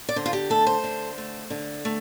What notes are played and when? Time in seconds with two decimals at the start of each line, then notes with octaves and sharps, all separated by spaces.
0.09 D5
0.16 D3 C5
0.26 F4
0.33 G4
0.50 A3 A4
0.67 C5
0.84 D3
1.18 A3
1.50 D3
1.85 A3